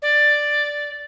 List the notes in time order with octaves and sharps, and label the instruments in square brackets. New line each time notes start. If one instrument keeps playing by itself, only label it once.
[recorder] D5